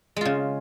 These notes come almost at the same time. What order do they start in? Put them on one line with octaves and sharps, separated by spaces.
G#3 F4 C#3